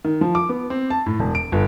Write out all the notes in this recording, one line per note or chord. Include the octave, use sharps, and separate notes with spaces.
D#3
F3
D6
B3
C4
A5
A2
E1
D7
G1